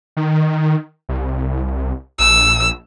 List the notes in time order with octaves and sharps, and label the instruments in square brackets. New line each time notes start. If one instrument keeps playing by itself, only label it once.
[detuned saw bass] D#3
C2
[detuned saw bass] A#1 [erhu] E6